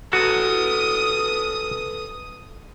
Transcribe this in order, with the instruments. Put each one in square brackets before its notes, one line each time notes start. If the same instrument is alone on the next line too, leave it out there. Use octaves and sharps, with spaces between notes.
[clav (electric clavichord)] F#4 [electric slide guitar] A4 B4 [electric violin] D#6